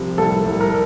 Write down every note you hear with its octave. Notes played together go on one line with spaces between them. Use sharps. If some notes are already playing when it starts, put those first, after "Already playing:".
Already playing: C2 C3 F3
C2 A4
C2
A#4